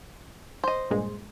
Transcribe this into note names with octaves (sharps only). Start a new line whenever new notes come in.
C5 D#5
G2 A#2 G#3